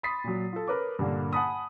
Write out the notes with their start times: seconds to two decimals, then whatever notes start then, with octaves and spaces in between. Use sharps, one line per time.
0.03 B5 C6 D#6 A6 B6 C7
0.24 A#2 F#3
0.53 F4 A4
0.68 A#4 B4 C#5 D6
0.99 G2 A#2 D3 A#3
1.33 F#5 G#5 A5 B5 D#6